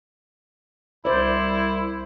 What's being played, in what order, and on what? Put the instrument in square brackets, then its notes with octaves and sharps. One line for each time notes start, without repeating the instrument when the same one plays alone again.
[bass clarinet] C2 [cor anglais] E4 [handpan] C5 D5